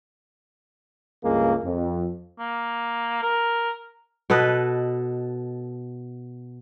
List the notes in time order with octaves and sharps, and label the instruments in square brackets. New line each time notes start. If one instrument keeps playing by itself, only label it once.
[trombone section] C#2 G2 G#3 A#3
F2
[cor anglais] A#3
A#4
[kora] B2 A4 B4 D#5